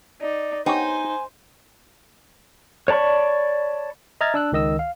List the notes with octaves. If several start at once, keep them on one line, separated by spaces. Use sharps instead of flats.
D#4 D5
B3 D#4 G4 C5 C#5 G#5
C#5 D5 A5 B5 C#6
D#5 E5 A#5 F6 G#6 A6
D4 E6 F#6
C#2 D#3 D#5 E6
F5